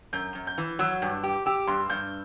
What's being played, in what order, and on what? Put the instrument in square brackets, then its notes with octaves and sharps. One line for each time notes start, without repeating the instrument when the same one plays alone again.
[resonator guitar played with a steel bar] F#2 [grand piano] G6
[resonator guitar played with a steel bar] F#2
[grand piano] G6
[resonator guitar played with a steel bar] E3
[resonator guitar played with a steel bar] F#3 [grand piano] E6
[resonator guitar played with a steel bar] G2
G4
[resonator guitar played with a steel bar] G4 [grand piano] E6
[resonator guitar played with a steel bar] G2 [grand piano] C6
[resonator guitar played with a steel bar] G2 [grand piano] G6